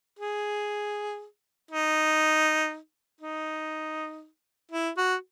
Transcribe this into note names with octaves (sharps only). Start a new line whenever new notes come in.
G#4
D#4
D#4
E4
F#4